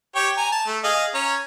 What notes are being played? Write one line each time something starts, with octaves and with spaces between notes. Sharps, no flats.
G4 C#5 G5
G#5 A#5
A5
A3
G#4 D#5 F5
C#4 C#5 A#5